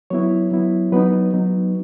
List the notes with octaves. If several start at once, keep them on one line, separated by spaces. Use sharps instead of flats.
F#3 B3 E4 C#5
F#3 B3 E4
F#3 B3 D#4 B4
F#3 B3 D#4